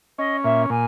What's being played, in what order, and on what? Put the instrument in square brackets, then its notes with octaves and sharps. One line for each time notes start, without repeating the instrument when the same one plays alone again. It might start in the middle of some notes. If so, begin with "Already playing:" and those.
[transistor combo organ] C#4 [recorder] D#5
[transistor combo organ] A#2 [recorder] E5
[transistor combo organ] A#2 [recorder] G#5